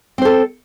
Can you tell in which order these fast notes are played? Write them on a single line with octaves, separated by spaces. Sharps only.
C4 C5 A4